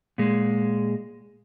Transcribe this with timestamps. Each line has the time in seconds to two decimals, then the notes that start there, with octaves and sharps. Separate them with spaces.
0.18 A#2 G#3